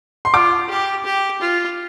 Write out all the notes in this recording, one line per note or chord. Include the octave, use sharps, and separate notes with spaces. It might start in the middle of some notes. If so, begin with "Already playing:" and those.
C6
F4 D6
G4
G4
F4